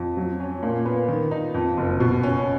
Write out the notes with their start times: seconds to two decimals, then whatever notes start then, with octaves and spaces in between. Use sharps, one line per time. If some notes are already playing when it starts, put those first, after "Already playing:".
Already playing: F2
0.17 F#3
0.40 C#4
0.63 A#2
0.86 B3
1.08 D#3
1.31 D#4
1.54 F2
1.77 F#1
2.00 B2
2.23 C#4